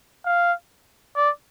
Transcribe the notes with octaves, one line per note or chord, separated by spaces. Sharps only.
F5
D5